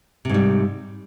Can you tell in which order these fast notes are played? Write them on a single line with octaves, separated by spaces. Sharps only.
C3 G#2 G3